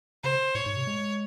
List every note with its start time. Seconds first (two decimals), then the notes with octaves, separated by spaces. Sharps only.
0.24 C#3 C5
0.55 A2 C#5
0.66 G#2
0.76 C3
0.87 G#3